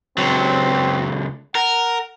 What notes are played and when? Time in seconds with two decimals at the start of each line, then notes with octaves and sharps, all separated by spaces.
0.18 C#2 F#3 C4
1.55 A#4 F#5